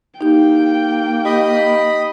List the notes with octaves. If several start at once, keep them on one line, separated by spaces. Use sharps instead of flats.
A#3 D#4 G4 G5
G4 D#5 B5